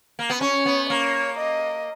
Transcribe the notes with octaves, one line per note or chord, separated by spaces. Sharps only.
A#3
B3
C#4 C#5
B3
A#3 C#5
D#5